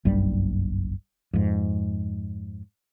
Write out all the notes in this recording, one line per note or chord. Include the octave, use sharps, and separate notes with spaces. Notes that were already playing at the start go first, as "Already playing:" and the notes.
F#1 B1 G2 G3
F2 G#2